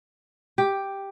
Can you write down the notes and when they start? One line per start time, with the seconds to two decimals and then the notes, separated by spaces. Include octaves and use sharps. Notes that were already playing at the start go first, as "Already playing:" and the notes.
0.58 G4